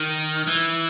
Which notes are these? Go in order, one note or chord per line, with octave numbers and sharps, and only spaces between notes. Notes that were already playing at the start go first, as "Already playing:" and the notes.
Already playing: D#3
E3